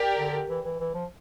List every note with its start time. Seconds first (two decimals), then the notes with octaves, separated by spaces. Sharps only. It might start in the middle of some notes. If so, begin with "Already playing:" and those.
Already playing: G4 A#4 D5
0.19 D3
0.49 E3
0.65 E3
0.80 E3
0.94 F3